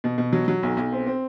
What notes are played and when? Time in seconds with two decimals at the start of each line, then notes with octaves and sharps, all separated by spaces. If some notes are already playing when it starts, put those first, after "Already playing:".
0.04 B2
0.18 B2
0.33 F#3
0.48 F#3
0.63 B1
0.77 B1
0.92 C4
1.07 C4